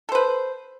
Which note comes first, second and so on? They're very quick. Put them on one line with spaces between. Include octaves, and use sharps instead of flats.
A4 C5 B4